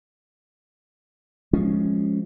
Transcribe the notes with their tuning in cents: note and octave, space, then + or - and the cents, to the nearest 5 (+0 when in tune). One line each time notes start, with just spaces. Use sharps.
F3 +0 G#3 +0 C#4 +0